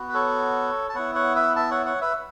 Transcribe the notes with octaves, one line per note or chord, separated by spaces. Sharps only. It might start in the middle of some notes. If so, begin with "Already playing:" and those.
Already playing: B3 F#4
B4
A4 C#5
A5
B3 E4 C#5 F#5
C#5 F#5
B4 E5
E5 A5
C#5 F#5
C#5 F#5
B4 E5